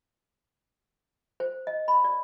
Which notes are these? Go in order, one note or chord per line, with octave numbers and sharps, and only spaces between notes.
C5
D#5
B5
D5